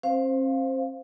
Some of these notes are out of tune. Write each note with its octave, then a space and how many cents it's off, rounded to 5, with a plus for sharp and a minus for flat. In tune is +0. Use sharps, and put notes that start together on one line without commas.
C4 +40 C5 +0 F5 +0